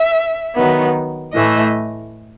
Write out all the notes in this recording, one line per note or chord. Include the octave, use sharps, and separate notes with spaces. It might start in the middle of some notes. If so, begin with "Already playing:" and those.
Already playing: E5
D#3 F#3 B3
A2 E3 A3 D#5